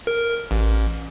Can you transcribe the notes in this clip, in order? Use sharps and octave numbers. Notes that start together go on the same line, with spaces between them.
A#4
A1